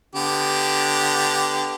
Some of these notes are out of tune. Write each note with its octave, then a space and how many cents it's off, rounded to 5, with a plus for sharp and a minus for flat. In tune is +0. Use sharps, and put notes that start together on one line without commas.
D3 -5 B3 +0 G4 +0